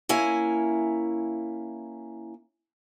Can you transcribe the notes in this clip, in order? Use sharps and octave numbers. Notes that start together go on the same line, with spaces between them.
A#3 C#4 E4 G#5